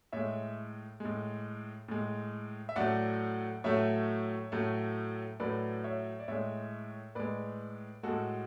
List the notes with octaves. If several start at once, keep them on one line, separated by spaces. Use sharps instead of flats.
A2 G#3 C#5 E5
A2 G#3
A2 G#3
E5
A2 F#3 A3 D5 F#5
A2 F#3 A3 C#5 E5
A2 F#3 A3
A2 F#3 A3 B4 D5
C#5 E5
D5
A2 G#3 C#5 E5
A2 G#3 B4 D5
A2 G#3 F#4 A4